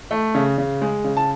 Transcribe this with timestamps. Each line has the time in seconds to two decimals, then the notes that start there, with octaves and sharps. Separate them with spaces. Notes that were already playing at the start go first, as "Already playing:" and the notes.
0.11 A3
0.35 C#3
0.58 C#3
0.82 G#3
1.04 C#3
1.17 A5